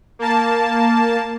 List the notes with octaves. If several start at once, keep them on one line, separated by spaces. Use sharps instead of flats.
A#3 A5